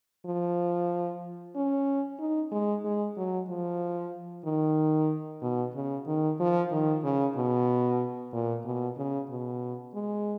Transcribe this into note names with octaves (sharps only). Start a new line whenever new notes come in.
F3
C#4
D#4
G#3
G#3
F#3
F3
D#3
B2
C#3
D#3
F3
D#3
C#3
B2
A#2
B2
C#3
B2
G#3